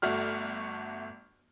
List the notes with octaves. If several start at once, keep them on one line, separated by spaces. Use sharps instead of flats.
G1 A3 F#4 F6